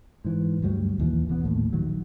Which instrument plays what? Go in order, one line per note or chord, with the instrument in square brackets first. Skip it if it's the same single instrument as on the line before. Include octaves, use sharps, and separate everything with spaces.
[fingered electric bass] G#2 E3
D2 G2 F#3 G3
A#1 D#2 E3
E1 E3 F#3 B3
A#1 D#2 A2
A#1 D#3 F#3